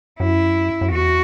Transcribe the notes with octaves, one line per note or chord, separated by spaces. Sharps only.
F#2 E4
F#2
E2 F#4